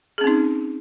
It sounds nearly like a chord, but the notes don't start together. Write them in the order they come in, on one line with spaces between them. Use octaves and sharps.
G#4 C#4 C4 D#4